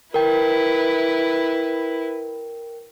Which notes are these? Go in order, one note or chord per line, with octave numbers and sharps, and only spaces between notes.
E4 A#4 B4 G5